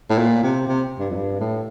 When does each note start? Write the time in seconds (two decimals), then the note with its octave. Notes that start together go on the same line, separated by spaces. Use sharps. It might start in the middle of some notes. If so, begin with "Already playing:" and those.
0.10 A2
0.18 A#2
0.43 C3
0.67 C3
0.99 G2
1.10 F2
1.15 G2
1.40 A2